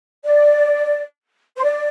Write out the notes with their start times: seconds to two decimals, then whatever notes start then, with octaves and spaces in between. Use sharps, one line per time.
0.24 D5
1.56 C5
1.63 D5